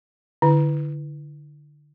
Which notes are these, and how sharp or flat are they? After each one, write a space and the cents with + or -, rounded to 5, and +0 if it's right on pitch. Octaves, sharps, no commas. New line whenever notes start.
D3 +10 E4 +0